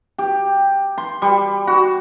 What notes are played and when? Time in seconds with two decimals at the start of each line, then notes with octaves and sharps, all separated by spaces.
0.19 G4
0.98 C6
1.22 G3
1.67 F#4